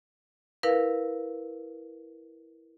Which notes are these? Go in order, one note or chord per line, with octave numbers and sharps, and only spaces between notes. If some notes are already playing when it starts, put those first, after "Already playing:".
E4 A#4 B4 F5